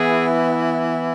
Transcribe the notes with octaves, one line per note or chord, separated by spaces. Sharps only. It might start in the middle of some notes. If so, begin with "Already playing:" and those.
Already playing: E3 B3 E4 G#4